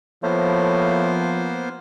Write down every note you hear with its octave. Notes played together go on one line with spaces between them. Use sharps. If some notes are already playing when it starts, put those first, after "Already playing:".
A2 F3 A#3 B3 C5